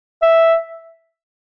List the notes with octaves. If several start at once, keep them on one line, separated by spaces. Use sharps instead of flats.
E5